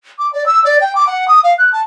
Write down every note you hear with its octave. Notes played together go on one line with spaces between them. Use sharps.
D6
D5
E6
D5
G5
D6
F#5
D#6
F5
F#6
A5